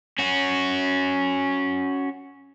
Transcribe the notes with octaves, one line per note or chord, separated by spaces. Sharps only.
C#4 F#4